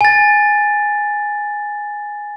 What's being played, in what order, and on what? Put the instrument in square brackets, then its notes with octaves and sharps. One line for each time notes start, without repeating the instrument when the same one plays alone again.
[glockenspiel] G#5 A6